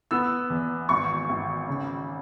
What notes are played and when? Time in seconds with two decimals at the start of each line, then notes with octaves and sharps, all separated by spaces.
0.11 B3 E6
0.50 E2
0.89 G#1 C#6
1.29 G#1
1.68 C#3